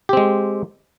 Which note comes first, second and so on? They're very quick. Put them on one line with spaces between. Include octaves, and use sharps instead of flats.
G4 C4 G#3